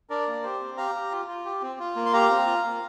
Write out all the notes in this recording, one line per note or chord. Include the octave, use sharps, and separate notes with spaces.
D4 A#4 D5
A#3
G4 C5
C4
G4 F5 A#5
G4
F4
F4
G4
C4
F4
A#3
C6
G4 F5 A#5
C4
F4
A#3